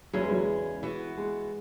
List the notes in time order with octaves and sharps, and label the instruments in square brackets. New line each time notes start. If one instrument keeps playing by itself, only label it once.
[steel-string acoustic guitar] E2 C#3 E3 C#4 G#4 [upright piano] F#3
[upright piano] G#3
F#3
G#3
[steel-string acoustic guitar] E3 B3 F#4
[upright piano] G#3